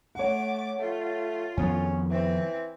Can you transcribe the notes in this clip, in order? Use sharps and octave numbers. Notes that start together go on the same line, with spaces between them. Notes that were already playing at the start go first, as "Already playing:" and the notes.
A3 C#5 F#5 D6
A3 F4
F2 D#3 B3 C#4
E3 C4